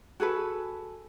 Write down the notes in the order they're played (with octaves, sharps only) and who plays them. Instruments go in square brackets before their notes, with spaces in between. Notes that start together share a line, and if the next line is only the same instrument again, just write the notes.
[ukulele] F#4 G#4 A4 B4